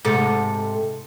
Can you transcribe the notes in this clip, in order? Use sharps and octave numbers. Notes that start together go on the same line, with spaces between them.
G#2 C3 A4